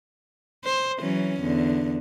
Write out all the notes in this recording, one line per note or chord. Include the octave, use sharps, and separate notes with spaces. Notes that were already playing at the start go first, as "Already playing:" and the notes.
C5
E3 F#3 C#4
E2 D3